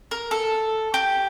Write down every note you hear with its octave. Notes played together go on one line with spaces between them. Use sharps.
A#4
A4
G4